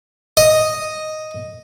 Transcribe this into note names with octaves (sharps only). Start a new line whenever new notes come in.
D#5